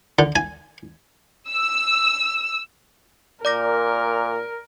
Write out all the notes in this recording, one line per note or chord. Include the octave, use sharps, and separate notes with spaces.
D3
G#5
E6
A#2 A#4 D5 D6 A#6